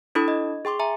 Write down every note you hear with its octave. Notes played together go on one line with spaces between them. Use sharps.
D4 E4 A4 B5 D#6
D#5
G#4 G5 C6 D6
E5 G#5 A#5